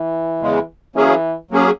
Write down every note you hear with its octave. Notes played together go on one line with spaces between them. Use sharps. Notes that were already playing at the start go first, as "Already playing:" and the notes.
Already playing: E3
E2 C#3 G#3
E3 F#3 A#3 C#4 G#4
F#3 A#3 C#4 G#4